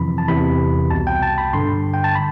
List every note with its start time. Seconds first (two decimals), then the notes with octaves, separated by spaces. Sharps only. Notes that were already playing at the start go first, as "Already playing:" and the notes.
Already playing: F2 C3 E3 B5
0.18 A5
0.28 E2 C3 E3 B5
0.90 C2 B2 A5
1.07 G5
1.23 A5
1.38 B5
1.53 G2 D3 C6
1.94 G5
2.04 A5
2.15 B5